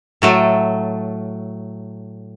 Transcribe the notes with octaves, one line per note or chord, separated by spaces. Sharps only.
A2 F#3 A3